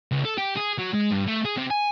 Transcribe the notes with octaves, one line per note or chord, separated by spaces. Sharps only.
C#2
A4
G4
G#4
F#3
G#3
G2
A3
G#4
C3
G#5